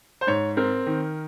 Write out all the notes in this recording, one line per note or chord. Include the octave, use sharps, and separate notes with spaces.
C5
G#2 C#5
C4 A#4
D#3